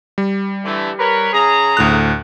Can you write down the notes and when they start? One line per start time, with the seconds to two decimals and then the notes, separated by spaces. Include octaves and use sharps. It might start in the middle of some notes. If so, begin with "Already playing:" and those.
0.18 G3
0.65 D3 E3 A3
0.99 A#4 B4 C#5
1.33 C#3 G#4 A#5
1.77 D2 A2 F#6